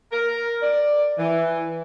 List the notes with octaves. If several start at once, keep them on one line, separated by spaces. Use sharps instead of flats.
A#4
D5
E3